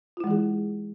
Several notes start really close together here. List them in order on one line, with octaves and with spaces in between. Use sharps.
F4 E4 G#3 E3 G#4